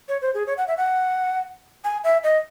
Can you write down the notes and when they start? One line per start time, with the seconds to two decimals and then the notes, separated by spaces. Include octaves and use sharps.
0.09 C#5
0.22 C5
0.34 G#4
0.47 C#5
0.57 F#5
0.68 E5
0.77 F#5
1.84 G#5
2.04 E5
2.24 D#5